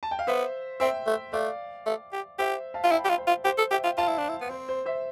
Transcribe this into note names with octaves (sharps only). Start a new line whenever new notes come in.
A5
G5
F5
B3 C5 E5
C4 E5 G5
A3
A3 D5 F5
A3
G4
G4 C5 E5
F5 A5
F4
E4 G5 B5
G4
F4
C5
F4
G4 C5
A4
G4 E5 G5
F4
F4 F5 A5
E4
D4
E4
B3
C4 C5
C5
C5 E5